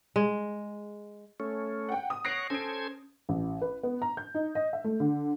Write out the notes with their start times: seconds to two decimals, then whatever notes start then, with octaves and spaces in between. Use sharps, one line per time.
0.16 G#3
1.40 A3 C#4
1.89 F#5 G5
2.10 D#6
2.25 C#5 F#5 A#6 C7 D7
2.50 C#4 A4 C5 G#6 D7
3.29 A1
3.62 B4
3.83 B3
4.02 A#5
4.17 G6
4.34 D#4
4.55 D#5
4.73 E5
4.84 A3
5.00 D3